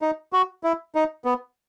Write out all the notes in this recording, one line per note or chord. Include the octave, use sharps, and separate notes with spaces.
D#4
F#4
E4
D#4
B3